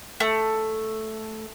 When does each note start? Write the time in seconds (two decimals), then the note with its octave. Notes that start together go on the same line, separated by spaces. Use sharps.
0.20 A3